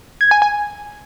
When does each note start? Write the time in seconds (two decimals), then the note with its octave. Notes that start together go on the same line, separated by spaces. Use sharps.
0.21 G#6
0.31 G#5
0.42 G#5